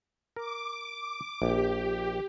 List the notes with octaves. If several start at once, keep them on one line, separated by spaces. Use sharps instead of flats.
A#4 D6
A#1 G4